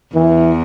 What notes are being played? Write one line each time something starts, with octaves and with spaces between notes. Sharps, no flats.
E2 E3